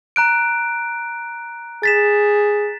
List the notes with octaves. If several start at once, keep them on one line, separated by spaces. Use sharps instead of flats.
A#5 F#6 D7
G#4 A6 B6 E7